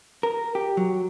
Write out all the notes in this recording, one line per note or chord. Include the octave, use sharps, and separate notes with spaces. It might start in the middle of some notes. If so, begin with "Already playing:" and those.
A#4
G4
F#3